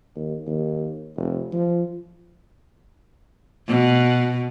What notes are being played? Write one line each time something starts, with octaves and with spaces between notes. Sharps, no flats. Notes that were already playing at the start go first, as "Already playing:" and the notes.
D#2
D#2
F1
F3
B2